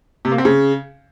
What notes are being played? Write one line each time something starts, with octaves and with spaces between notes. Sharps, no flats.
C3
A#3
C4
C#3